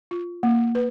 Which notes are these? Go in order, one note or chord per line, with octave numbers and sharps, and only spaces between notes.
F4
A#3
B4